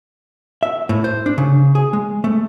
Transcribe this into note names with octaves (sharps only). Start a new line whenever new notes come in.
E5
A2
C5
D4
C#3
G#4
G#3
A3